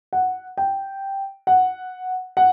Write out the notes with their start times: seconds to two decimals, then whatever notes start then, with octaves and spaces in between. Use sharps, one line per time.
0.13 F#5
0.57 G5
1.47 F#5
2.37 F#5